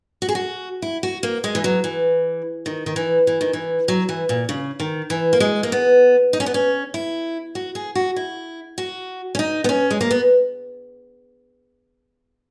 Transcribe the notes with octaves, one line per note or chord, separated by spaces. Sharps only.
F#4
G#4
F#4
E4
F#4
A#3
G#3
E3
F#3
E3
D#3
D#3
E3
E3
D#3
E3
F#3
E3
A#2
C#3
D#3
E3
A#3
G#3
A#3
B3
D#4
C#4
B3
C#4
E4
F#4
G#4
F#4
E4
F#4
C#4
D#4
B3
C#4
G#3
A#3
B3